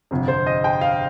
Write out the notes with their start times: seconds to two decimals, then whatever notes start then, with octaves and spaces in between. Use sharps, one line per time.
0.11 G1 F2 C3
0.28 C5
0.47 D#5
0.64 G5
0.81 F5